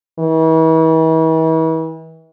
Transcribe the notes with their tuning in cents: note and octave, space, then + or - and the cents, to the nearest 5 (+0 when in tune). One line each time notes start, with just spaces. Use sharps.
E3 -40